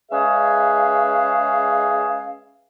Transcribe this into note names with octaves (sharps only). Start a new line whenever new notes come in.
G#3 C#4 G#4 B4 E5 F5